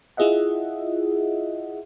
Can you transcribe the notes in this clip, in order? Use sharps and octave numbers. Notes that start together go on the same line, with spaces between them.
E4 F4 G#4 D#5 E5 F#5